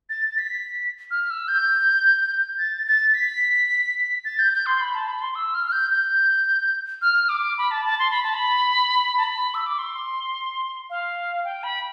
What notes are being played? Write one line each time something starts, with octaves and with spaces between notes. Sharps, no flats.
A6
A6
B6
F6
E6
G6
A6
A6
B6
A6
G6
G6
C6
B5
A5
B5
C6
E6
F6
F6
G6
G6
F6
D6
B5
A5
A5
C6
B5
A5
B5
A5
B5
E6
D6
C6
F5
G5
B5